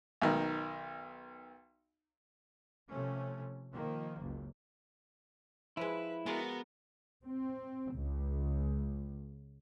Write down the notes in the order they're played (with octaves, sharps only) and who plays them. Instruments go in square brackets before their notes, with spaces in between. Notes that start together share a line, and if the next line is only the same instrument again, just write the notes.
[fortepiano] B1 D#3
[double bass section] C3 F3 A3 C#4
D#3 F3 A#3
F#1 C#2
[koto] F3 G#3 [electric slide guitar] E4 [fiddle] B4
[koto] G#3 D5 F5 [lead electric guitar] B3 [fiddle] F#4 A#4
[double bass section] C4
C#2